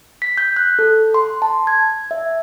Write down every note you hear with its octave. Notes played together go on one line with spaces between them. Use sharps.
B6
G6
F#6
A4
C6
A5
G#6
E5